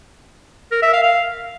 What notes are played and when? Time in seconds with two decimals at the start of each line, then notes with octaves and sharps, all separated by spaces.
0.72 A#4
0.82 E5
0.93 F5
1.03 F5